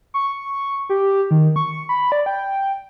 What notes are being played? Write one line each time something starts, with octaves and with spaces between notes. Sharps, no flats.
C#6
G4
D#3
C#6
B5
D5
G5